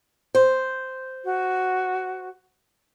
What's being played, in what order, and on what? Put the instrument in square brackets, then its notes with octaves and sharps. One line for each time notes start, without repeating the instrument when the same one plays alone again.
[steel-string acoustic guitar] C5
[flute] F#4